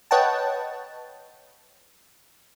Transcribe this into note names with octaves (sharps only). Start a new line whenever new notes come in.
B4 C#5 D#5 F#5 G5 A5